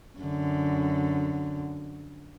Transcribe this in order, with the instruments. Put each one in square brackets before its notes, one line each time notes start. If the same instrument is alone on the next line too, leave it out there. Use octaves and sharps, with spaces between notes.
[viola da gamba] F#2 D3